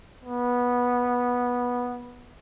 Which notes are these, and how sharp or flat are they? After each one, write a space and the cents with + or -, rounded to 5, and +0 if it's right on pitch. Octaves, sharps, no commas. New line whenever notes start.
B3 -15